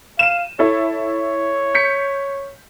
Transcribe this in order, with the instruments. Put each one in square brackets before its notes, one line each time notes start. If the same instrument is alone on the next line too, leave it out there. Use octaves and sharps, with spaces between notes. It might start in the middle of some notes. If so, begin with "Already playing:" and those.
[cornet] F5 [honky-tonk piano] D#7 E7
[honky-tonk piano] E4 A4 [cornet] C#5
[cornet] C#5
[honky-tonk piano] G6 B6 C#7